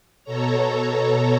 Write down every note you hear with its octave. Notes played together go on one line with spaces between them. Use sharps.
B2 A4 C#5 A#5